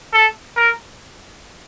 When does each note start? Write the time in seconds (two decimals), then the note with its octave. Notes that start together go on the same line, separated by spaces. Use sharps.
0.13 A4
0.56 A#4